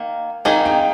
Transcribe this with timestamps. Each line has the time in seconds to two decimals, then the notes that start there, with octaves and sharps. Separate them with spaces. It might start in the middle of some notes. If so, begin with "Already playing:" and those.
Already playing: D#3 A#3
0.45 D#3 A#3 D#4 G#4 G#5
0.66 G5